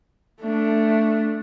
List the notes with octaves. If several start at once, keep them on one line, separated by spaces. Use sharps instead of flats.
A3 D4